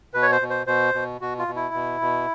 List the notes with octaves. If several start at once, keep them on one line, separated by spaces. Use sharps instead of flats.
B2 B4
C#5
C5
B2
C5
B2 C5
B2
B2 F#4
F4
B2
E4
B2
B2